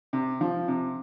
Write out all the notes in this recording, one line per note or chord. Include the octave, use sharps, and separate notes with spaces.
C3
F3
C3